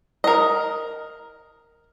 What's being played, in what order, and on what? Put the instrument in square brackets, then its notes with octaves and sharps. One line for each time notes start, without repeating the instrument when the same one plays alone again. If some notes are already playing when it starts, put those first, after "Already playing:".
[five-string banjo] A#4 D#5